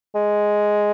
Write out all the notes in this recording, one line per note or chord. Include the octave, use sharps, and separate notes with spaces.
G#3